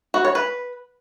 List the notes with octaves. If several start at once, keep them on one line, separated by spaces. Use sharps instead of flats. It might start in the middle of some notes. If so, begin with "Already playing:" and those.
F#4
C#5
B4